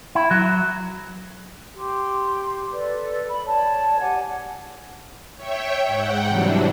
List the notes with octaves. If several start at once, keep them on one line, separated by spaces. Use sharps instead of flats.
E4
F#3
G4 C6
A4 B4 D5
B5
C#5 D5 A5
G4 F#5 G#5 G#6
C#5 E5 G5
G#2 F#5 G5
C3 E3 F#3 G3 D4